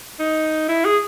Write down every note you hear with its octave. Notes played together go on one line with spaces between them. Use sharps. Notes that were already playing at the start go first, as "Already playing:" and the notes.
D#4
E4
G#4